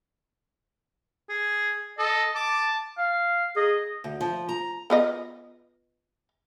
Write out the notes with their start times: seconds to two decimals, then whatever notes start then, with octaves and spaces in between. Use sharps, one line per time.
1.29 G#4
1.98 A4 D#5
2.35 A5 D6
2.98 F5
3.56 G#4 D#5
4.04 D2
4.21 F3
4.49 A#5
4.90 B3 F4 D#5